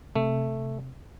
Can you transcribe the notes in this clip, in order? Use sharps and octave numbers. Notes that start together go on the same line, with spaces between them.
C3 A3